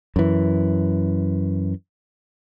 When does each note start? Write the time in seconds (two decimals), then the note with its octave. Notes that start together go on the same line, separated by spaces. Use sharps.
0.16 F#2 E3